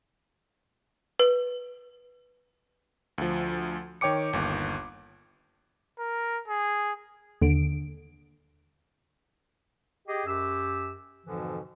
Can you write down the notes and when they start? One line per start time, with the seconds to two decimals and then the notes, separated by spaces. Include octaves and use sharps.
1.20 B4
3.18 D2 F3
4.01 D#3 C#5 G5 D6 C#7
4.33 G1 D#2
5.99 A#4
6.48 G#4
7.42 D#2 D3 D7
10.07 G4 G#4 D#5
10.26 F#2 G4 E6
11.25 F2 G#2 B2 D3 E3 F3